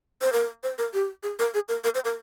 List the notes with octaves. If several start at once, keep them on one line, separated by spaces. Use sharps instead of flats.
C5
A#4
C5
A#4
G4
G#4
A#4
G#4
A#4
A#4
C5
A#4